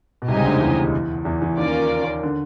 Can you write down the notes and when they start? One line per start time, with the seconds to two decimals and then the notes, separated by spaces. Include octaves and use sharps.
0.22 B2
0.28 C2 C3 D#4 G4 C5 D#5 G#5
0.36 C#2 C#3
0.45 D2 D3
0.52 D#2 D#3
0.60 E2 E3
1.25 E2 E3
1.41 E2 E3
1.57 D#2 D#3 A#3 C#4 F4 A#4 D5
2.23 D3